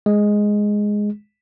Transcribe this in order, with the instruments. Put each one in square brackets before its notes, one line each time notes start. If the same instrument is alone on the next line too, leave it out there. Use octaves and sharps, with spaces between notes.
[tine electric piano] G#3